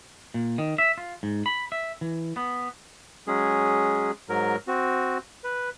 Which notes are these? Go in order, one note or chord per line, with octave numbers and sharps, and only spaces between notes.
A#2
D#3
E5
F4
G#2
B5
E5
E3
B3
F#3 G#3 C#4 G#4
G#2 F#3 A#4
C4 F#4
B4